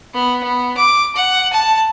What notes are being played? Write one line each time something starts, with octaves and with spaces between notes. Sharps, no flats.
B3
B3
D6
F#5
A5